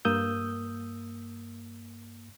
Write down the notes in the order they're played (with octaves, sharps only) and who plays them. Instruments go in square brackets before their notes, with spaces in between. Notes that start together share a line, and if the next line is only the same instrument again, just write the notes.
[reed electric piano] G2 A#3 D#6 E6 G6